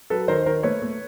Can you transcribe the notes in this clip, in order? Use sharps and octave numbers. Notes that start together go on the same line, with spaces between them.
F#3 A4 B4
D#3 A#4 C5
D#3 A#4 C5
A3 B4 C#5
A3